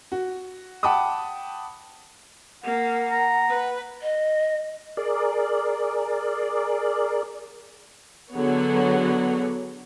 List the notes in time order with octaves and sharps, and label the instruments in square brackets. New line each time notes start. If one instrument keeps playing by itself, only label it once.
[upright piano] F#4
F#5 G5 A5 B5 D6 D#6
[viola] A#3 [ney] F#5
[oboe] A#5
[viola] B4
[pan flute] D#5
[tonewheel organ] G#4 A#4 D5
[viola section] D3 F#3 B3 F#4 G#4 C#5